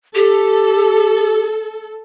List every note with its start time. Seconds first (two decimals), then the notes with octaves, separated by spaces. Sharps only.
0.15 G4 A4